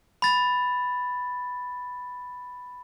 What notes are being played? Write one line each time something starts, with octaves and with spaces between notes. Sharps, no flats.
B5 A6